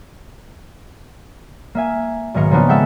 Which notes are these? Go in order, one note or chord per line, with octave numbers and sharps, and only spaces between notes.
A#3 E5 G#5
B1 G#2 D#3 A#4 C#7
C#3 F3 A#3 B3 D4 D#4
G#3 A4 E5 F#5 G5